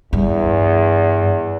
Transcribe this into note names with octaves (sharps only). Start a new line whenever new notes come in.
E2 G2